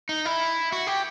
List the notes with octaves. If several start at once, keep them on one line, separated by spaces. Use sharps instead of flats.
D#4
E4
F#4
G4